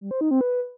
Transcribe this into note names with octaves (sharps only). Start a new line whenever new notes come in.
G3
C5
D#4
C4
B4